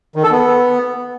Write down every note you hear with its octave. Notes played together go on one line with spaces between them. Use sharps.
D#3
A4
B3